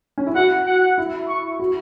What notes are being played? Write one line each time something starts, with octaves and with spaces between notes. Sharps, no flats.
C#4
E4
F#4 F#5
F#5
E4
C#6
F#4